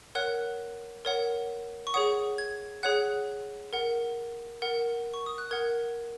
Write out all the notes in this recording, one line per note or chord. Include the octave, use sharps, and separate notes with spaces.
A#4 C#5 F#5 F#6
A#4 C#5 F#5
C#6
G#4 C#5 F#5 D#6
G#6
G#4 C#5 F#5 F#6
A#4 F#5
A#4 F#5
C#6
D#6
F#6
A#4 F#5 G#6